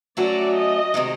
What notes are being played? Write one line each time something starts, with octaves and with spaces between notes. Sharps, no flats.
F#3 A3 C#4 F#4 D5
D#5
C3 D#3 G#3